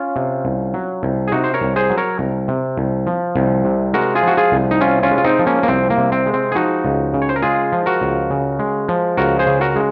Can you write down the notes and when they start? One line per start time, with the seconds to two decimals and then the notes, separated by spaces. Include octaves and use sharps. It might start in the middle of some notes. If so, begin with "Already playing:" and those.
Already playing: C#4 F4
0.16 C3
0.45 C2
0.74 F#3
1.03 C2
1.28 G#4
1.32 C3 D#4 F#4
1.44 C5
1.54 A#4 C#5
1.61 C2
1.76 G#4 C5
1.90 F#3
1.98 A#4 C#5
2.19 C2
2.48 C3
2.77 C2
3.07 F3
3.36 C2
3.64 C3
3.94 G#3 F#4 A#4
4.15 F4 G#4
4.23 F3 F#4
4.37 F4 G#4
4.52 C2
4.71 D#4
4.81 C3 C#4 F4
5.03 C#4 F4
5.11 G#3
5.18 F4
5.24 C4 D#4
5.39 F3
5.46 A#3 C#4
5.63 A#3
5.68 C2 C4
5.90 A#3
5.98 C3
6.12 C4
6.26 G#3
6.34 C4
6.52 G#4
6.55 F3 D#4 F#4
6.85 C#2
7.14 C#3
7.22 C#5
7.29 C5
7.36 A#4
7.42 G#3 F4 G#4
7.72 F3
7.86 F#4 A#4
8.01 C#2
8.30 C#3
8.59 G#3
8.88 F3
9.17 C#2 F#4 A#4
9.39 G#4 C5
9.47 C#3
9.61 F#4 A#4
9.76 G#3